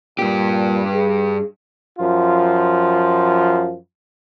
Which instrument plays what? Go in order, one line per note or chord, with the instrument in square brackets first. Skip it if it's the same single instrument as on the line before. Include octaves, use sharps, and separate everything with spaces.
[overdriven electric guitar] G2 G4 [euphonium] A#2
[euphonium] G#4
[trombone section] F#2 F3 F4